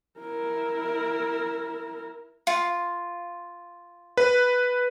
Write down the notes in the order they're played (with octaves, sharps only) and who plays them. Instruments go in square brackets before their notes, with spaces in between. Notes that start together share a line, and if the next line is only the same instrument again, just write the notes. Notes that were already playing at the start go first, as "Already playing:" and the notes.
[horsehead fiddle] E4 A#4
[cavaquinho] F4
[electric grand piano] B4